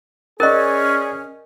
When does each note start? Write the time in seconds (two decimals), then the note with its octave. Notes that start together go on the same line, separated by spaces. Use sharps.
0.40 C#4 G#4 A#4 D5 D#5 F#6 A6